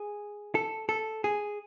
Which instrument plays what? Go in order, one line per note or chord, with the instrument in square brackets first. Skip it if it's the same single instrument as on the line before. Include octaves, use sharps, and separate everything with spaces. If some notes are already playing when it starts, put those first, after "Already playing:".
Already playing: [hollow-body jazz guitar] G#4
A4
A4
G#4